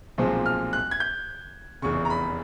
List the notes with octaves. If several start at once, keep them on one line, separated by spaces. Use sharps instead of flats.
B1 A#2 F3 G#3 C4
F6
F#6
G#6
G6
F1 E2 C#3 C#6
A#5
B5